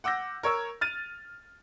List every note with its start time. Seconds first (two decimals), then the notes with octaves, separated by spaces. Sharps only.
0.04 F#5 D6 E6 G6 A#6
0.43 A#4 C#5 C#6 E6
0.81 F6 A6 D#7